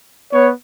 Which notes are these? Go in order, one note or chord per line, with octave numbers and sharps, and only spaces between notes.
B3 C#5